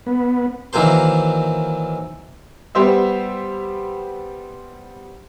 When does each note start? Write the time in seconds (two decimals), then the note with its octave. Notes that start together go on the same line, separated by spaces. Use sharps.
0.06 B3
0.73 D#3 E3 F#3 A#3 C5 C6
2.75 G3 B3 G4 C5 E5